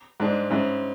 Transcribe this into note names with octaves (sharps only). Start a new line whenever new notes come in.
G#2 G#3 D4
G#2 G#3 C#4 E4